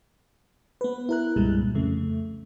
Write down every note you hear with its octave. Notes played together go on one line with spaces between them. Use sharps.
B3 B4
E4 A#4 F#6
C2 G2 A#2 G3 G#3
F2 C#3 A3